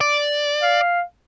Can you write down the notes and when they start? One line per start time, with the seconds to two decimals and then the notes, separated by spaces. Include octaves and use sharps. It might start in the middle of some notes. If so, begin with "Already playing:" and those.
0.01 D5
0.62 F5